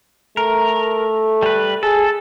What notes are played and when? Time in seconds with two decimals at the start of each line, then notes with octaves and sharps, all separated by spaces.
0.37 A3 A#4
1.43 G3 B4
1.83 G#4 A4